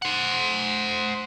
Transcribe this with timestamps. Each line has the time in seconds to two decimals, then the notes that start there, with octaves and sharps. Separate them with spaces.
0.02 C5 F#5